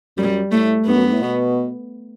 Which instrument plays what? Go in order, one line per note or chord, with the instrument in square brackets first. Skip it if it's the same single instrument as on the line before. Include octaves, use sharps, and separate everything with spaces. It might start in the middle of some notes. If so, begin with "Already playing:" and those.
[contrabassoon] F#2 [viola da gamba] G3
[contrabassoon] A2 [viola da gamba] A3
[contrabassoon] G2 [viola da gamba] B3
[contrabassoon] F#2
G2
A2
B2